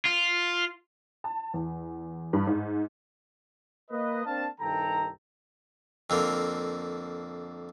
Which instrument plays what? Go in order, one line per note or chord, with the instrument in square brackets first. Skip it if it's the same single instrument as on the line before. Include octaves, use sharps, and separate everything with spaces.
[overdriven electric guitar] F4
[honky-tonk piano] A5
E2
G2
G#2
[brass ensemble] A#3 B4 D#5
A#3 C4 D4 F5 A5
C2 G2 D#3 A4 G5 A#5
[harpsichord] F2 D3 A#3